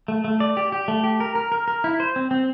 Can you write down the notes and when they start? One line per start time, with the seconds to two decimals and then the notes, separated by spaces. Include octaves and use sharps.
0.08 A3
0.24 A3
0.40 D5
0.57 G4
0.72 G4
0.88 A3
1.04 G4
1.20 A#4
1.35 A#4
1.52 A#4
1.68 A#4
1.84 E4
2.00 C5
2.16 C4
2.31 C4